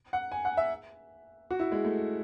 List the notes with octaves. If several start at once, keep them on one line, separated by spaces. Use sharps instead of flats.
F#5
G#5
F#5
E5
F#4
E4
G#3
A3